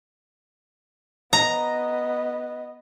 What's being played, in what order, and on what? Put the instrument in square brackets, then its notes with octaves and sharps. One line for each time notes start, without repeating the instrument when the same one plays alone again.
[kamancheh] B3 D#5 [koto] A#5